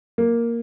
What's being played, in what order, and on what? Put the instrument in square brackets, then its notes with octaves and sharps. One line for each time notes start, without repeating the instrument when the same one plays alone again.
[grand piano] A#3